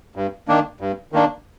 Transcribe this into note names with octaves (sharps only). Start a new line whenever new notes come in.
G2
D#3 A#3 D4
G2
D#3 A#3 D4